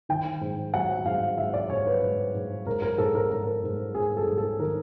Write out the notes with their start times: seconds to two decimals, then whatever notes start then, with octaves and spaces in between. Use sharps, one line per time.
0.09 D#3 G5
0.41 G#2
0.74 F#3 F#5
1.05 G#2 F5
1.38 G#2 E5
1.54 D5
1.70 G#2 C#5
1.87 B4
2.02 G#2
2.35 G#2
2.66 G#2 A#4
2.82 A#4
2.98 G#2 A4
3.15 A#4
3.30 G#2 A#4
3.64 G#2
3.95 G#2 G#4
4.17 A4
4.27 G#2
4.38 A4
4.59 D#3 A#4